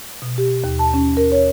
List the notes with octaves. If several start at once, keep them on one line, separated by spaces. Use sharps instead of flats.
B2
G4
D#2
A5
C#4
A#4
C#5